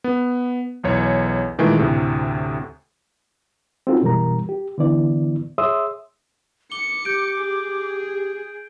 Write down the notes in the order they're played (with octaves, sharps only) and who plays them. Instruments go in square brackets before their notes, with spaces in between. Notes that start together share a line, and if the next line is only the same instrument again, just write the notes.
[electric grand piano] B3
B1 E2 C#5
A#2 D#3 E3 G#3 A3
D2 A2 C3
[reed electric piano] C4 C#4 D#4 F4 F#4 A4
F#2 B2 E3 G3 A#4 A#5
G4
D3 E3 B3 E4 D5
G#4 C#5 E5 C6 D#6 E6
[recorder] D6 [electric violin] C#7 [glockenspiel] G7
[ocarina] G4 [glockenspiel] G6 D7
[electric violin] G#4